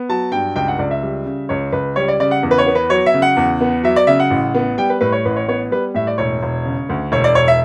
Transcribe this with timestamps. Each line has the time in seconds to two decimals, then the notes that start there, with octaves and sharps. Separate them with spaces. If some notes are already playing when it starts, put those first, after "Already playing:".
Already playing: B3
0.09 F#3 A5
0.32 G2 G5
0.56 C#2 G5
0.68 F#5
0.79 C#2 D5
0.91 E5
1.03 G3
1.26 C#3
1.49 C#2 C#5
1.72 C#2 B4
1.96 G3 C#5
2.08 D5
2.20 C#3 D5
2.31 F#5
2.43 E2
2.51 B4
2.58 C#5
2.66 B3
2.75 B4
2.90 F#3 C#5
3.06 E5
3.14 C#3
3.22 F#5
3.37 E2
3.60 B3
3.83 F#3 E5
3.96 D5
4.07 C#3 E5
4.20 F#5
4.30 A1
4.55 B3
4.78 G3 G5
4.90 B4
5.01 A2 B4
5.12 C#5
5.25 A1 B4
5.36 C#5
5.48 B3 C#5
5.71 G3 B4
5.94 A2 E5
6.07 D5
6.18 E1 C#5
6.43 E1
6.65 C#3
6.89 D2
7.12 E1 C#5
7.24 D5
7.35 E1 C#5
7.48 E5